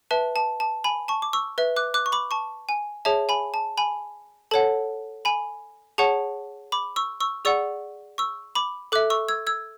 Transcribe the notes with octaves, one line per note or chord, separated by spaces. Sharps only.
B4 E5 A5
A5
A5
G#5 B5
A5 C#6
D6
C#6 E6
B4 E5
D6 F#6
D6 F#6
C#6
B5 D6
A5 C#6
G#5
G#4 C#5 E5 A5
G#5 B5
A5
G#5 B5
A4 C#5 F#5 A5
G#5 B5
G#4 C#5 F#5 A5 C#6
B5 D6
C#6 E6
C#6 E6
G#4 D5 F#5 C#6 E6
C#6 E6
B5 D6
A4 E5 D6 F#6
C#6 E6
E6 G#6
E6 G#6